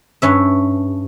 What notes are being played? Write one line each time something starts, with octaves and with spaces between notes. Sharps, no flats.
G2 C#4 E5